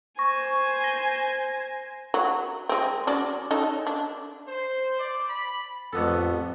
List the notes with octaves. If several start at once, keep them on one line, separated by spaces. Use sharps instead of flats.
C5 G#5 C#6
A#6
F#3
G#3 C4
F#3 C#4 D5
C#4 D#4 A4
D4
C5
D5
B5
A1 F2 B3 A4